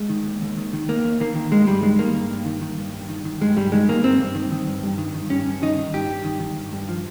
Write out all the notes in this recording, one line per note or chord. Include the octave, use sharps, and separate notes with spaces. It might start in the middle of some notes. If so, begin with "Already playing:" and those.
Already playing: G#3
D#3
D#2
D#2
D#3
D#3
D#2 A#3
D#2
D#3 A#3
D#3
G2 G#3
G2 G3
D#3 G#3
D#3 A#3
G2
G2
D#3
D#3
G2
G2
D#3
D#3
G2 G#3
G2 G3
D#3 G#3
D#3 A#3
G2 C4
G2
D#3
D#3
G2
G2
D#3
D#3
G2 C#4
G2
D#3 D#4
D#3
G2 G4
G2
D#3
D#3
G2
G2
F3